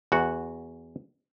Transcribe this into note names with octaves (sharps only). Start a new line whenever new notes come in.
E2 F#4 F#5